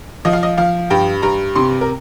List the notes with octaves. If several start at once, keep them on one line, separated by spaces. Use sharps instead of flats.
F3 D#5
F5
D#5
F3 F5
G2 G5
G2 A#5
C3 C6
A#4